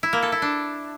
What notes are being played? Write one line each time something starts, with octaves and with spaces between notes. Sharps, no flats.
E4
A#3
A4
E4
D4